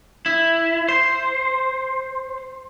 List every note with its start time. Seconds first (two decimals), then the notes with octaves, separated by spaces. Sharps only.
0.26 E4
0.89 C5